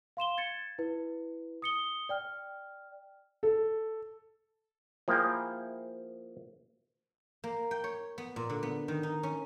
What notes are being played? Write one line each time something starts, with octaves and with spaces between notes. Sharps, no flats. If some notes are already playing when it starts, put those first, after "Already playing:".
F5 C6 E7 G7
G#6 A6 C#7
E4 B4
D#6 C#7 G7
D5 G5 F6
A4
F3 A#3 E4 G#4 G5
A#3
G5
C#5
B3
A#2
D3
B3
D#3
D#4
C#4